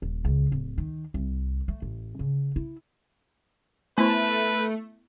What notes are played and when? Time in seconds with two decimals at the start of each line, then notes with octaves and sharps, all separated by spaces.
0.02 D#1
0.25 C#2
0.52 D1
0.78 D#3
1.14 C2
1.68 A3
1.82 A1
2.19 C#3
2.56 E4
3.98 A3 B3 E4 B4 C5